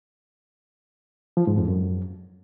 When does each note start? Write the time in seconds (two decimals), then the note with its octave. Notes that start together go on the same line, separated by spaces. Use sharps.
1.37 F3
1.47 G#2
1.58 F2
1.68 F#2